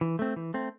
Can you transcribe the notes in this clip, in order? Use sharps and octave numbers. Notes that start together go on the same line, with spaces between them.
E3
A3 C4
E3
A3 C4